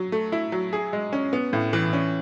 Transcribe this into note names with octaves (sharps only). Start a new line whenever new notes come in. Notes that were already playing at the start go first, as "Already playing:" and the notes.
Already playing: F#3
A3
E4
F#3
G#4
G#3
C#4
B3
A2
E3
C#4